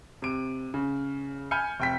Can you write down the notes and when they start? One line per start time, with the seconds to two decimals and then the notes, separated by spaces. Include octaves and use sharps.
0.22 C3 D7
0.74 C#3
1.51 G#5 B5 F6 G6 C#7
1.80 F1 G5 B6